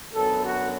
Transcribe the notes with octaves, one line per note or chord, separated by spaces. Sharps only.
F#2 D3 B3 A4
F#4